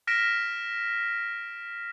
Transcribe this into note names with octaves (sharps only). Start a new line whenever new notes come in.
F6 A#6 B6 D7 E7